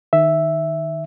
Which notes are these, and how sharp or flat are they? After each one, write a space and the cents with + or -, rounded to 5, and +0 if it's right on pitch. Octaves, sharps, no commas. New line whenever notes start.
D#3 -10 E5 +0